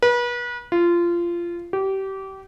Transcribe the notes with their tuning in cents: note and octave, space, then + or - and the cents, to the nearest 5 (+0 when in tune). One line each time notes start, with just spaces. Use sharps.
B4 -35
F4 -20
G4 -25